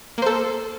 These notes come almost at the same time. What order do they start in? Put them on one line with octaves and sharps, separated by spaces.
A#3 C5 A4